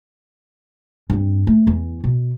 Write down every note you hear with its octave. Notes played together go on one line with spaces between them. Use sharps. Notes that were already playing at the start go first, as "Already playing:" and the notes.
G2 C4
A3
E2 E3
B2